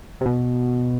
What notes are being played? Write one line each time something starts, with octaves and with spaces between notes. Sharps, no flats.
C3
B2